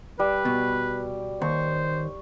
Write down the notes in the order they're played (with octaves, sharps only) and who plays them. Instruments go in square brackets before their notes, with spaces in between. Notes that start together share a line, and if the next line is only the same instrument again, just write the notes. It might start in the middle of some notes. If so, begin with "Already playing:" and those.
[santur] G3 [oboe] B4
[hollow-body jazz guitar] B2
[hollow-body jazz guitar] D#2 [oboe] C5 [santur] C#6